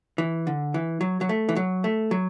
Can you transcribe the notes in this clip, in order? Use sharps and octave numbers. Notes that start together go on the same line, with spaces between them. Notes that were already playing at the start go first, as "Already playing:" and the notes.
E3
D3
E3
F#3
F#3
A3
E3
F#3
A3
F#3